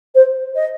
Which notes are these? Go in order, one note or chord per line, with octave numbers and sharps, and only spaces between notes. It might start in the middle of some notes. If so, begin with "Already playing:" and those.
C5
D#5